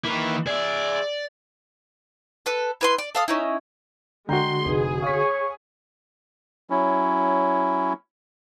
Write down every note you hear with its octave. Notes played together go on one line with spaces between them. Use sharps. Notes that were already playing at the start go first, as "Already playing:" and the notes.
D#3 E3 A#3 E4
G#4 D5 E5
A4 B4
E4 B4 C6
D5
A4 F5 D#6
C#4 D#4 E4
D3 G#3 F#4 G5 A#5 C6 G6
F1 D#4 G#4 B4
C#5 F5 C#6 B6
F#3 C#4 E4